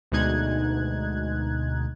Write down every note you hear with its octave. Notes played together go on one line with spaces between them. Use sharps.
D2 B2 G#3 D#4 F#6 G#6